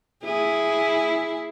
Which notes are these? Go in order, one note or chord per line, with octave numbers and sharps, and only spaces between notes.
E4 G#4